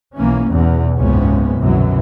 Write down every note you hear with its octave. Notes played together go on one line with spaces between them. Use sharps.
B1 E3 A#3 C#4
B1 E2 B2
F#1 C#2 G#2 C3 B3 C#4
C2 F#2 B2 D3 E3 F#3